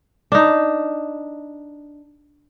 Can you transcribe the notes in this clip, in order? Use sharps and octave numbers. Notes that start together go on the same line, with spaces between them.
D4 D#4